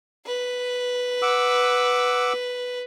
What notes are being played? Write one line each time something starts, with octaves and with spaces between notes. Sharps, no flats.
B4
F#5 D6 E6